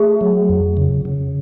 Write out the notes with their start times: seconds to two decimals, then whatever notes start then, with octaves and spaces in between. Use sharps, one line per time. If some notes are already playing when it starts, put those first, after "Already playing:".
Already playing: A3 G#4
0.21 F#3
0.49 F2
0.77 C#3
1.05 C#3